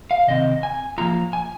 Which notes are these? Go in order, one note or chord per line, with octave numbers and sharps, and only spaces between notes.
F5
C3 D#3 C4 D#5
G#5
F3 A#3 F4 A#5
G#5